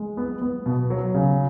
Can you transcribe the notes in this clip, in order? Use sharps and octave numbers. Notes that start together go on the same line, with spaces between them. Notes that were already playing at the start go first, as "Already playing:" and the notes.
Already playing: G#3
B3
B3
B2
F#3
C#3